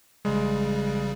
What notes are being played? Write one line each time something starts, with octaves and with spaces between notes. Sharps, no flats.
A1 C#3 G3 G#3